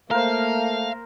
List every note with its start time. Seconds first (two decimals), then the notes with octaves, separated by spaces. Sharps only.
0.11 A3 A#3 A#4 C5 F5